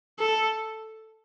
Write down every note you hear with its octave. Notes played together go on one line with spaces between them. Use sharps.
A4